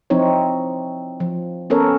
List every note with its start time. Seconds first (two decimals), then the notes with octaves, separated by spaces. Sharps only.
0.10 F3 C4 D#4 E4 C#5
1.20 F3
1.70 B3 C#4 A4 A#4 C#5